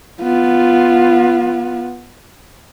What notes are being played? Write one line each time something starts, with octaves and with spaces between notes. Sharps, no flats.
B3 F4